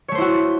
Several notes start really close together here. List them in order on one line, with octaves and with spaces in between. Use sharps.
C#5 A3 C5 E4 F#4